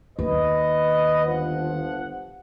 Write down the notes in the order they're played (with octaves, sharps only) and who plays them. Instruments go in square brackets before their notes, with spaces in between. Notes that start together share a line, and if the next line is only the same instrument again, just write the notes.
[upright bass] D#2 [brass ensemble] B4 D#5
[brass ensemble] G1 F3 F#5